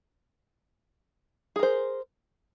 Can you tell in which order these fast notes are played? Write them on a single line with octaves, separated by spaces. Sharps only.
G#4 A#4 C5